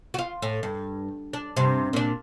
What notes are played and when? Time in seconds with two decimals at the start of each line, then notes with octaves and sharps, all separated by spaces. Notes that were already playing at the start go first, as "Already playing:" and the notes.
0.14 F4 F#4
0.42 A2
0.63 G2
1.33 D4
1.57 G2 C3
1.93 A#2 D4